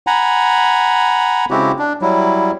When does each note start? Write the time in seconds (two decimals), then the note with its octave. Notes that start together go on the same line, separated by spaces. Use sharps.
0.07 F#5 G#5 A#5 B5
1.51 C#3 G#3 C4 E4 F#4 G4
1.79 D4
2.02 F#3 G3 E4